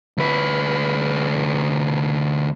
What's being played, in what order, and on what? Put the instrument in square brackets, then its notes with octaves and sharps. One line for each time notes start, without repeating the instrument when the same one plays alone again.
[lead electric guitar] D2 B4